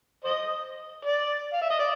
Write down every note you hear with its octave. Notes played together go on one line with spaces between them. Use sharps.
C5 D#5
D5
F5
E5
D#5
D5